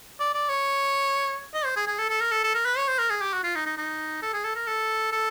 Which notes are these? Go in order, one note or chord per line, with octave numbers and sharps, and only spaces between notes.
D5
D5
C#5
D#5
C5
G#4
G#4
A4
A4
A#4
A4
A4
A#4
B4
C#5
C5
A#4
G#4
G4
F#4
F4
D#4
D#4
D#4
A4
G#4
A4
A#4
A4
A4